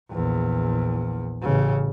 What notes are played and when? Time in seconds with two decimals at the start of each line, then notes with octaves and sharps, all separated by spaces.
0.11 A#1 E2
1.42 A1 C#3